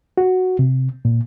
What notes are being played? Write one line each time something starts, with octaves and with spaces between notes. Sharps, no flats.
F#4
C3
A#2